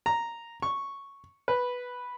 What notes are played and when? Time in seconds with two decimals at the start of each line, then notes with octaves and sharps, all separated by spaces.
0.06 A#5
0.62 C#6
1.48 B4